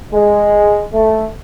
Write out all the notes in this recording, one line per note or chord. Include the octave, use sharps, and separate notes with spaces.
G#3
A3